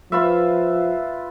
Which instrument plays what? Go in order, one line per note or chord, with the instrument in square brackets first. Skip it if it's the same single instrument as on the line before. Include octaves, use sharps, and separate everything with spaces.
[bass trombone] F3 [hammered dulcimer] F4 B4 E5